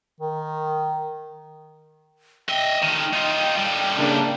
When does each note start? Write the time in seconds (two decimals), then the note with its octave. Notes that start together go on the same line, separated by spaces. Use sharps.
0.20 D#3
2.49 D#5 E5 G5
2.83 D#3 A3
3.14 D#4 F4
3.57 A2 G3
3.97 C#3 A#3 D4